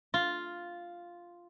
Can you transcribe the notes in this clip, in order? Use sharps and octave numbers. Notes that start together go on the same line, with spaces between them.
F4